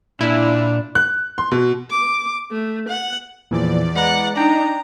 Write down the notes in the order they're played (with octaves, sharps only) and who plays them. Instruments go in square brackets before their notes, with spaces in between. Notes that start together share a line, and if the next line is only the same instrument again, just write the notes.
[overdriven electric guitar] A#2 [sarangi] D4 [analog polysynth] E4
[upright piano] F#6
C6
B2
[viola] D6
A3
F#5
[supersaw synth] E2 D5 [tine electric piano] A#2 E3 F3
[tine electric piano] G#3 B4 A#5 [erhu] F#5
[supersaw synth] D4 D#4 [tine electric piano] D5 G5 [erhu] A#5